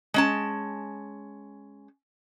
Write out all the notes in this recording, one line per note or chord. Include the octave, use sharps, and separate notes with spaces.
G#3 C#4 A5